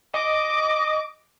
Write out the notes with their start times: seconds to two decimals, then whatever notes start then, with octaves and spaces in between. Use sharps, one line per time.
0.14 D#5 D6